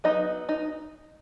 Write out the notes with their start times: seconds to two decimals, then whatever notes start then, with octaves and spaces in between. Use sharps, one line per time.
0.04 F#3 B3 D#4 D#5
0.49 D#4